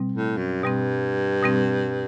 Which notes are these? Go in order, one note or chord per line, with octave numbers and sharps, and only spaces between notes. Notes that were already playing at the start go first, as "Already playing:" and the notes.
Already playing: B2 G3 C4
A2
F#2
G2 B2 G3 C4
B2 G3 C4